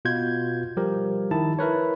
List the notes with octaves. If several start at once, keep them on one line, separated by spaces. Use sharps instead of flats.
B2 F4 G6 G#6
F3 G3 G4 A#4
D#3 E4 A5
E4 A#4 B4 C#5